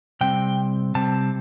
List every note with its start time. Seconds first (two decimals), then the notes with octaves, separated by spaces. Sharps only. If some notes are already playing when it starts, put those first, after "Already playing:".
0.21 C3 G3 C4 G5
0.95 C3 G3 C4 A5